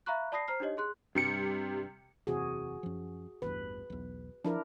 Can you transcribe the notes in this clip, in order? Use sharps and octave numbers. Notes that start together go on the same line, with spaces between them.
E5 F5 A#5 B5 C#6 F#6
D5 A5 B5 D#6 A#6 C7
C5 A#5 F6 C7
D4 D#4 G4 C#5 D#5
G#4 C6 F#6
G2 C3 G3 C#7
F#1 E2 C3 F#4 G#4
F#2 F3
A1 E2 G2 B4
B1 E2
F3 D4 E4 A#4